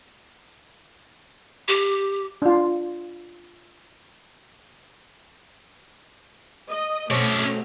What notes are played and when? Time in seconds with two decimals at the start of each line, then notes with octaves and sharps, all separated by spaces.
1.68 G4
2.42 D4 F4
6.70 D#5
7.10 B2 F#3 A3 C4 C#4 D5